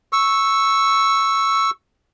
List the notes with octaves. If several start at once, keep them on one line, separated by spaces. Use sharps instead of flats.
C#6 E6